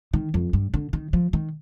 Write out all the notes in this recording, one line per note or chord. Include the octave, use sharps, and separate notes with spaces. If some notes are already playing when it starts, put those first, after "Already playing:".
D#3
F2
G2
D3
D#3
F3
D#3